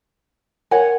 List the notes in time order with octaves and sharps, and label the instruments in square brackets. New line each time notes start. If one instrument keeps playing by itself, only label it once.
[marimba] A#4 [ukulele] C#5 F#5 G#5